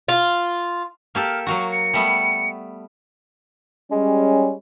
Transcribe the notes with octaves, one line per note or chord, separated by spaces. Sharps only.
F4
A#3 G4 A4 F6
F#3 A#3 F#4 C#6
C#7
G3 A3 B3
G3 G#3 C#4